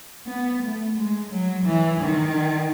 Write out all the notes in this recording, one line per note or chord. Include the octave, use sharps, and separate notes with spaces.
B3
A3
G#3
F#3
E3
D#3